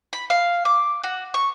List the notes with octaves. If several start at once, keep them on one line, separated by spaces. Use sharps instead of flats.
B5
F5
D6
F#4
C#6